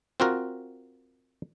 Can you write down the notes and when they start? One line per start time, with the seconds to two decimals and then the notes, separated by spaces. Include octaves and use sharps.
0.20 C4 F4 F#4 A#4